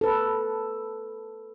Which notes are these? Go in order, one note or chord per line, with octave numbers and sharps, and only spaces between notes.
A4 B4